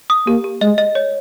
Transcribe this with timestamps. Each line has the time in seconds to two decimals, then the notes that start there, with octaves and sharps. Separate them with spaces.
0.10 D#6
0.27 A#3 G4
0.44 G4
0.61 G#3 D#5
0.78 D#5
0.95 C#5